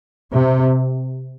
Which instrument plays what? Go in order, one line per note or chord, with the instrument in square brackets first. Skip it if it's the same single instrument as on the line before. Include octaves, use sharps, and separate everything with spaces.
[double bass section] C3